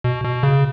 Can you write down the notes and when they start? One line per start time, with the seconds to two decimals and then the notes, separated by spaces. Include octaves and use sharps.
0.04 B2
0.24 B2
0.43 C#3